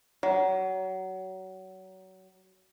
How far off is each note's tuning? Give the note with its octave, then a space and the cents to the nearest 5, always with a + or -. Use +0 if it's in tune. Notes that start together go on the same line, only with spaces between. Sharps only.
F#3 +25